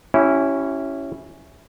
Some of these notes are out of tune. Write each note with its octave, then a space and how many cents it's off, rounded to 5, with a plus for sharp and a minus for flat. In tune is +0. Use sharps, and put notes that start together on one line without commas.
C#4 +0 E4 +0 G4 -35